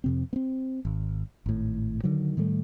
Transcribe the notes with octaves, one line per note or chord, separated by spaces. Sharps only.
F2 C3 C4
B3 C4
G#1
G#1 A2
D3 D#3 F#3
A2 D#3 G3 A3